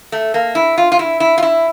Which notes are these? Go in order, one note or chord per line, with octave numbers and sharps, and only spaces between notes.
A3
A#3
E4
F4
F4
E4
E4
F4
E4